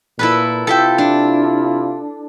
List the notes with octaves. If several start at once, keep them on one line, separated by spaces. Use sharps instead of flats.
A#2 E4 A4 B4
C3 E4 F4 A4 E5 G5
D4